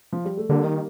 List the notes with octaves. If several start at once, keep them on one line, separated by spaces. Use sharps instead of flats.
F3
G3
A3
D3 G3 A#3
D#3